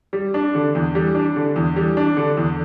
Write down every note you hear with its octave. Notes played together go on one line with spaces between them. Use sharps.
G3
D4
D3
E2
G3
D4
D3
E2
G3
D4
D3
E2